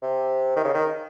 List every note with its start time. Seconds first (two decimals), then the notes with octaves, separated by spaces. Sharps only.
0.02 C3
0.56 D#3
0.64 C#3
0.74 D#3